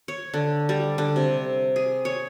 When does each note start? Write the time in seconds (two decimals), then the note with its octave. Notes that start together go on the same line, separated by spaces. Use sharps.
0.08 C#5
0.34 D3
0.69 G3
0.98 D3
1.16 C3
1.76 G#4
2.05 C#5